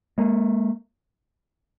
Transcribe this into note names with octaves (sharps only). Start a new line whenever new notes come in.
G#3 A#3